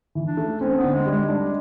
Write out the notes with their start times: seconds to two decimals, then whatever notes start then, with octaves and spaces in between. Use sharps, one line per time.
0.15 E3
0.26 D4
0.37 A3
0.60 C4 C#4
0.78 B3
0.83 D3
0.94 G#3
1.06 G3
1.11 G#3
1.28 G#3 D4